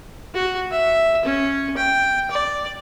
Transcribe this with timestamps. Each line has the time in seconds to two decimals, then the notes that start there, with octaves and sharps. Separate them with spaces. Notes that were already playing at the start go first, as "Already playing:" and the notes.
0.35 F#4
0.71 E5
1.25 C#4
1.77 G5
2.31 D5